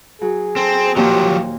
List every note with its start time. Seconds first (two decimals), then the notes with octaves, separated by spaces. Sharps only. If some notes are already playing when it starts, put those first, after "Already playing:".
0.22 F#3 G#4
0.56 C4 A4
0.96 D#2 A#2 F3 F#3 C4 G4